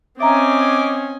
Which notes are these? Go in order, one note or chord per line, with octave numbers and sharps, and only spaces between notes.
C4 C#4 D#5 E5 G#5 A#5 D6